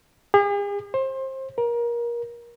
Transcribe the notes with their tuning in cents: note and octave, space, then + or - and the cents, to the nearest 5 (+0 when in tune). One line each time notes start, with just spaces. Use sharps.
G#4 -45
C5 +25
A#4 +25